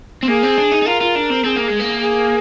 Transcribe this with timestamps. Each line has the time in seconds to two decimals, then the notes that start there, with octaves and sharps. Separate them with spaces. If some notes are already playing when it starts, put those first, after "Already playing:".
0.23 C4
0.28 A#3 G#4
0.43 C4
0.58 D4
0.71 D#4
0.82 D#4
0.86 F4 A#4
1.00 F4
1.15 D4
1.30 C4
1.44 C4 G#4
1.56 A#3
1.68 G#3
1.79 A#3
2.02 G#4